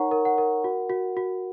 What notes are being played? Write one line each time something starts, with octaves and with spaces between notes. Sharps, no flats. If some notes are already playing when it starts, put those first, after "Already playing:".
Already playing: D#4 A#4 C#5 F#5 A#5 C#6
A#4
F#5
A#4
F#4
F#4
F#4